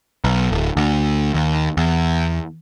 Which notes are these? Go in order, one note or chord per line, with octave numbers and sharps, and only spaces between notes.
B1
D1
D2
D#2
E2